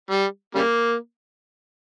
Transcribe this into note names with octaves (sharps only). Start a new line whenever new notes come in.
G3
C#3 G3 A#3